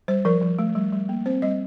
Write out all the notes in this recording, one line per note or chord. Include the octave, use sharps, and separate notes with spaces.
G3 C5
F3 A#4
F3
A3
G3
G3
A#3
C4 C5
G3 D#5